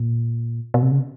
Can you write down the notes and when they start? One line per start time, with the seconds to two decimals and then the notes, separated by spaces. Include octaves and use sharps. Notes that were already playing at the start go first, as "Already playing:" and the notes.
Already playing: A#2
0.74 B2
0.82 C3
0.91 C#3